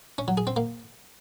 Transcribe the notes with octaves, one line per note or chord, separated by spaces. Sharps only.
C#4
F#3
G#4
C4
A#3